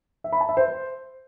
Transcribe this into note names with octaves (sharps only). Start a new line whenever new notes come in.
E5
B5
A5
E5
C5